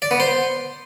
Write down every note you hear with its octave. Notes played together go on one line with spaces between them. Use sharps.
D5
B3
C5